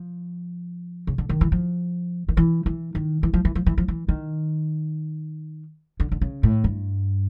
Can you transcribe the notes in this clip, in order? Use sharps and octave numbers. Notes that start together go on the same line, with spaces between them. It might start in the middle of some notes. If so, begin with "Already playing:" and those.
Already playing: F3
C#3
D3
D#3
E3
F3
D#3
E3
E3
D#3
E3
F3
E3
F3
E3
F3
E3
D#3
D3
D3
C#3
A2
G2